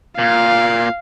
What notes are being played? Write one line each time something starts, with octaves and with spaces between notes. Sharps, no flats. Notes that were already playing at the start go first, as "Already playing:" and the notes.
A#2 F5